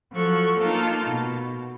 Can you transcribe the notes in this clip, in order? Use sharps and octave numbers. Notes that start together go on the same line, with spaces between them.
F3 F#3 A4 C#6 F#6
A#3 D#4 F4 A4 A#4
B2